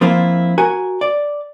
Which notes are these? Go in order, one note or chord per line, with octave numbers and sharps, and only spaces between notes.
F3 A#3 C4 E4 F4
F#4 A#4 G#5
D5